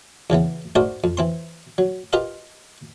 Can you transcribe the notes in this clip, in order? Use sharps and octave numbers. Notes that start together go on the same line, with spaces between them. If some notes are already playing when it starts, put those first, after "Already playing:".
E2 C#3 E3 B3
G#2 A3 F#4 A#4 C5 D5
F2
E3 C4 C6
F#3
F4 G4 A#4 B4 D#5 F5